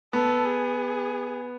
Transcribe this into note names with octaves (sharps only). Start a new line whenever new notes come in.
B3 A4
G#4